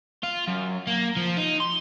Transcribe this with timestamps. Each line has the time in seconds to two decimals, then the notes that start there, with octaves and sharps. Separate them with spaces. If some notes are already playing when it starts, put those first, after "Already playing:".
0.23 F4
0.47 F#2
0.87 A#3
1.17 F3
1.37 D#4
1.60 C6